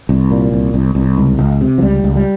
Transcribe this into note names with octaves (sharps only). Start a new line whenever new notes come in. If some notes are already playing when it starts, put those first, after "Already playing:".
C2
A#2
C2
C2
C2
C#2
C#2
C3
F3
C#2 G3
C#2
G3